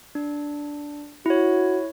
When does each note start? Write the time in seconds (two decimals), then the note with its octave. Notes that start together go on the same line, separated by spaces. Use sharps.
0.15 D4
1.26 E4 F#4 C#5